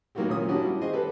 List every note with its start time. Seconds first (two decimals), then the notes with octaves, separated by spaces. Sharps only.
0.15 D#3 F#3 A#3 E4 F#4 G4
0.29 A#2 C#4 D#6
0.48 C#4 D4 E4 F#4 G4
0.65 G3
0.81 G#4 C5 D#5
0.93 G4 A4 B4